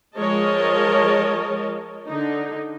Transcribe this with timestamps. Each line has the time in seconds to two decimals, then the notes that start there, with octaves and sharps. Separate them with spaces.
0.16 F3 G#3 A#4 C#5 D#5 A5
2.07 D3 D#4